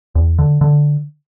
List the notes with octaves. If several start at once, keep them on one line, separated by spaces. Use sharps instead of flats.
E2
D3
D3